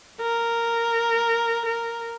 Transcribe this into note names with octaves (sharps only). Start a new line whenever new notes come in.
A#4
A#4